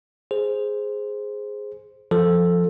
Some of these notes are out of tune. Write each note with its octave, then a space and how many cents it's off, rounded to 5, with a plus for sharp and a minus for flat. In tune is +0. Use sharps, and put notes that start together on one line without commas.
G#4 +0 C5 +0
F3 +0 A4 +0